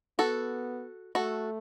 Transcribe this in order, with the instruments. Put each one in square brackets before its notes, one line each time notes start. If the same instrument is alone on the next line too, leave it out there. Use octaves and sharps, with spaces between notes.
[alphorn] B3 [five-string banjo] F#4 A4
[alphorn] A3 [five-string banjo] F#4 A4